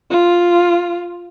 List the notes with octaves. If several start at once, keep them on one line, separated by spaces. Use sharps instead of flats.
F4